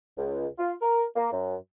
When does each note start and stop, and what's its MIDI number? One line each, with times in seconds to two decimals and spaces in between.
0.17 0.47 37
0.58 0.73 65
0.82 1.04 70
1.16 1.32 58
1.32 1.55 42